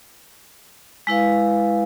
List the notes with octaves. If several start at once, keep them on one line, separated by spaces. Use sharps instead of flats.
G#3 E4 B4 F5